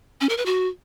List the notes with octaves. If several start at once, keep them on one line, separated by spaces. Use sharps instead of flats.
C#4
A#4
B4
F#4